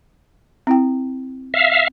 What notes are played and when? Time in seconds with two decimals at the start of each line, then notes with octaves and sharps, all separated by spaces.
0.67 C4 E4 G5
1.54 E5 F5